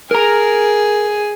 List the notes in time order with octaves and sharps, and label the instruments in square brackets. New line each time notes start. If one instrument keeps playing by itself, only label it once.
[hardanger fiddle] G#4 [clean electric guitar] A#4 A#5